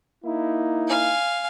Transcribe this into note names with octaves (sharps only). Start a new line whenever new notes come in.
A#3 D#4 E4
F5 G#5